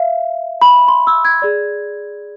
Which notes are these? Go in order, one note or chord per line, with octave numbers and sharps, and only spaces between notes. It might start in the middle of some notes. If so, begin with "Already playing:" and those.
Already playing: E5 F5
B5
C6
E6
G#6
G#4 D5